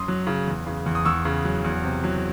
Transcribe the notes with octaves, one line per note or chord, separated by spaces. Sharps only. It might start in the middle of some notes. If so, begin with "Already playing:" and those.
Already playing: F#2 C6 D#6
F#3
C#3
E2
C#3
E2
D#6
E2 C#6 E6
C#3
F#3
E2
C3
F#3